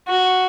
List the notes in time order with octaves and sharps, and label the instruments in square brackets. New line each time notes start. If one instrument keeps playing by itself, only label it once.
[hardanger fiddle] F#4